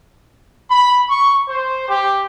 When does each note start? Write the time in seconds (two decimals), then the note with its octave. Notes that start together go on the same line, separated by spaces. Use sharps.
0.71 B5
1.10 C#6
1.49 C5
1.89 G4